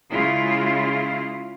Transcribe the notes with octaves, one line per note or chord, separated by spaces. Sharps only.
C#3 G#3 E4 F4